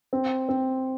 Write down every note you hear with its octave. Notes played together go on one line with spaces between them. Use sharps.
C4
C4